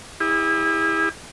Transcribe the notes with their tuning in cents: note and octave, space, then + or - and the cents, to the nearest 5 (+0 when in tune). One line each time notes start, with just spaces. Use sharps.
E4 -15 G#4 -45